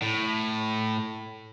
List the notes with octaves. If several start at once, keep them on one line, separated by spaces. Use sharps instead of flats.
A2